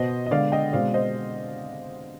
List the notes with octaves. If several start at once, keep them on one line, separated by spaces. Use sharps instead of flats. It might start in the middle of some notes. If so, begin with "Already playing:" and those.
Already playing: B2 B3 C5 D#5
D#5
D3 G#3 B3 D5 F5
D#5 G5
B2 G#3 C4 D5 F5
C5 D#5